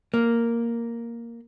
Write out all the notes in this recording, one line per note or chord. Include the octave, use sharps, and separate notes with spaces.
A#3